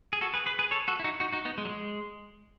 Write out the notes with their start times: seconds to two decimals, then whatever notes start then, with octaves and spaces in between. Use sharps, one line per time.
0.13 G#4
0.21 F#4 A4
0.34 G#4 B4
0.46 G#4 B4
0.59 G#4 B4
0.71 A4 C#5
0.88 F#4 A4
1.00 E4
1.04 D#4 F#4
1.20 D#4 F#4
1.32 D#4 F#4
1.45 B3 D#4
1.58 G#3
1.65 F#3
1.69 G#3